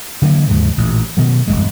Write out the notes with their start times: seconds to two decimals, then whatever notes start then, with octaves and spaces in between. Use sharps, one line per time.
0.22 D3 E3 F#3 A#3
0.49 D#2 G#2 C#3 F3
0.78 A1 A#2
1.17 B2 D#3 F#3
1.48 E1 C#2 G2 G#3